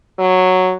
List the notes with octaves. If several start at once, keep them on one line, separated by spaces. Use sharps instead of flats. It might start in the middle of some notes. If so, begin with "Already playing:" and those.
F#3